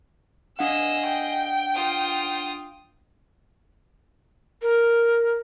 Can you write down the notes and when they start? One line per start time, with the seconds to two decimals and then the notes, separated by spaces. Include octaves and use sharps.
0.59 D4 G#4 D#5 F5 F#5 E6
1.09 G5
1.74 F4 D#6
4.62 A#4